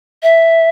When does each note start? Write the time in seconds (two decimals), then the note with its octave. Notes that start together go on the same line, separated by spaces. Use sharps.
0.23 E5